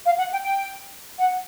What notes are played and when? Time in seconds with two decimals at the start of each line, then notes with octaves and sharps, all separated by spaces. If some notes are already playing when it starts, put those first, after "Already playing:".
0.06 F5
0.18 F#5
0.32 G5
0.44 G5
1.20 F#5